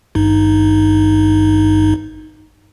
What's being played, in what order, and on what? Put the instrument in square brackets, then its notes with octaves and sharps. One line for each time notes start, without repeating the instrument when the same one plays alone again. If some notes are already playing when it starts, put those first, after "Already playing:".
[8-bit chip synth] G#1 G2 D#4